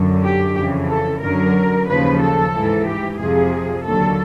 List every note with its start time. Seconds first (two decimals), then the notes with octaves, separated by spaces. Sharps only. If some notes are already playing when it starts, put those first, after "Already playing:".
Already playing: F#2 D3 F#3
0.23 G4
0.56 F2 C#3 E3
0.89 A4
1.21 F#2 D3 F#3 A#4
1.87 D#2 C#3 F3 B4
2.20 A4
2.53 G#2 E3
2.86 G4
3.18 F2 C3 F3 G#4
3.84 D#2 D3 F#3 A4